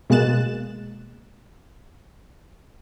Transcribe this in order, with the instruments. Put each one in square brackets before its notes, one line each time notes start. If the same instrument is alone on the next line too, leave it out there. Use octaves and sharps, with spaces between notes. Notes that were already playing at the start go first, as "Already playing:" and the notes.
[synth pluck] B2 G#3 A#3 F#6 A6 E7